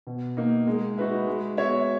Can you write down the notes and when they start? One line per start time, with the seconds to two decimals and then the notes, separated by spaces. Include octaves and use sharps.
0.07 B2
0.37 A#3 D#4
0.67 G#3
0.98 D#4 F#4 B4 E5
1.27 G#3
1.57 B3 F#4 C#5 E5